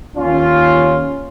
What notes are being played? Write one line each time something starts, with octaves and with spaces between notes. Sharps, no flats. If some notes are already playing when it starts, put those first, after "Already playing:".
D#2 C#4 F4